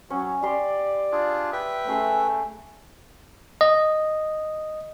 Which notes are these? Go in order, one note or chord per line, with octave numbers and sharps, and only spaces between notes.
F#3 C#4
G4 D5 C6
D4 F4 G#4
B4 E5 G5
A3 C#4 G#4 C6
D#5